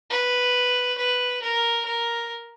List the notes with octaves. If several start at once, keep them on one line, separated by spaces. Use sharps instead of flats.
B4
B4
A#4
A#4